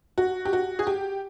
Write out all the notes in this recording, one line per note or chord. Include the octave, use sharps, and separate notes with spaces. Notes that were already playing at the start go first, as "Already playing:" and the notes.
F#4
G4
F#4
G#4
G4